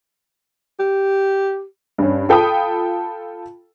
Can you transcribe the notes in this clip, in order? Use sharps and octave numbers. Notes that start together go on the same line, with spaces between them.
G4
G2 C#4
F4 A4 G5 B5 D#6